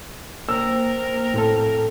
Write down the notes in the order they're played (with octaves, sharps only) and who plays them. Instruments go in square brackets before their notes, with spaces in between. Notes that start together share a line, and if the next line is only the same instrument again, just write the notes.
[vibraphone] A#3 C5 G5 [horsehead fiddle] A#4 [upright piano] E6
[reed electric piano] A2 C4 A4